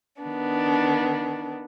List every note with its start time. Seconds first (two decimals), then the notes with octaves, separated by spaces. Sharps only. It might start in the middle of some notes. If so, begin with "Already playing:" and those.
0.20 D#3 B3 D4